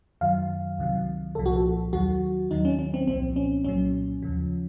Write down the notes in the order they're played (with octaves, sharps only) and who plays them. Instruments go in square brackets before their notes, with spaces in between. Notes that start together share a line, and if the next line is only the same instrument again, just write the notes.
[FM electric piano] F#2 D#3 F#3 F5
C#2 C3 D#3 F#3
C2 A#2 F3 A4
F#4
A4
D#2 D#3 F#3 F#4
D#2 D#3 F#3 D#4
C#4
C#4
C4
C2 A#2 F3 C4
C#4
C2 A#2 F#3 C#4
D#2 C#3 F3